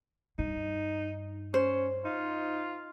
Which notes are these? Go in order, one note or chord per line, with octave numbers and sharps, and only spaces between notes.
G2 D#4
C#4 C5
D#4 F4